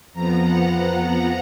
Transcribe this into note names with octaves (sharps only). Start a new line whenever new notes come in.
F2 F3 B3 A#5
F#5